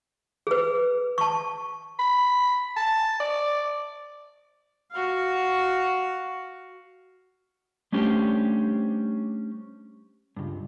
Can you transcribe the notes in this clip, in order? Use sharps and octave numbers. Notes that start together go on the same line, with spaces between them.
G#4 B4
A5 C#6
B5
A5
D5
F#4 F5
G3 A3 C#4 D4 G4 C5
C#2 G2